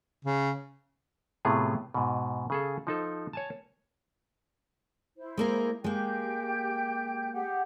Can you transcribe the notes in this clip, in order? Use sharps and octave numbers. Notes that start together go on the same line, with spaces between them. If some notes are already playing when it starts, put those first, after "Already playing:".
C#3
A2 C3 A3 B3 F4 G#4
G#2 B2
C#3 G#4 A4
F3 D#4 A4
C#5 G#5 A5
E4 C5
G#3 A#3 A#4
G#3 A#3 G4 G5 G6
G4 G#4 F#5